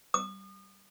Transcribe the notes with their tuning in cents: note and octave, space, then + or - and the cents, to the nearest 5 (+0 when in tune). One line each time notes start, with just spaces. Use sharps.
D#6 -40